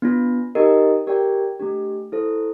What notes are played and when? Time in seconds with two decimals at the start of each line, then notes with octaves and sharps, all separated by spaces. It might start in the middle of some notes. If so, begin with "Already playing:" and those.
0.02 B3 D4 F4
0.55 D#4 G4 A#4 D#5
1.07 G4 A#4 D5 G5
1.59 A3 D4 G4
2.12 E4 A4 C5